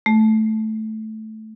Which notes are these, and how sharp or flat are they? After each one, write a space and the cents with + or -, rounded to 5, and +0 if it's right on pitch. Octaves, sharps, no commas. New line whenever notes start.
A3 -10